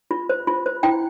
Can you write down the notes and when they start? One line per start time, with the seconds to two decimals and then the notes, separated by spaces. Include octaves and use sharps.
0.11 F4
0.29 C5
0.47 F4
0.66 C5
0.83 E4 G5